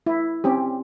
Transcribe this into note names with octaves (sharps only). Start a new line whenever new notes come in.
E4
C4 C#4 G4